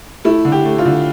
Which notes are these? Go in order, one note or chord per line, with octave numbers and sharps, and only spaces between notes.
A3 E4
D3
G4
A3
F4
D3